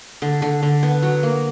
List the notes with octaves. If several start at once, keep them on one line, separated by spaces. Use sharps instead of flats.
D3
D3
D3
B3
F#3
A#3